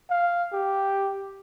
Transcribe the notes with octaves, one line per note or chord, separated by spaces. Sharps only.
F5
G4